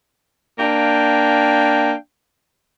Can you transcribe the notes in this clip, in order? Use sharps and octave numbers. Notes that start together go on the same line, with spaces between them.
A#3 D4 F5 G5